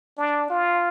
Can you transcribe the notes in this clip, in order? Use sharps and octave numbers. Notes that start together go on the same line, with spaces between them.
D4
F4